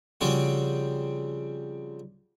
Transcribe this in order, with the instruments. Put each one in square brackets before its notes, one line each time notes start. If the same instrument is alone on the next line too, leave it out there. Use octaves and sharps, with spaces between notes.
[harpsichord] C#3 F3 G3 C4 F4 F#4